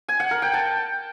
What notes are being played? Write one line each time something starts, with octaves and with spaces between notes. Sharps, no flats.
G#5
F#5
A#4
G5
A5